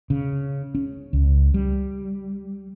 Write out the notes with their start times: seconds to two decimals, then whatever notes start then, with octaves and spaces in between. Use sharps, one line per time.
0.10 C#3
0.75 C#4
1.13 C#2
1.54 G3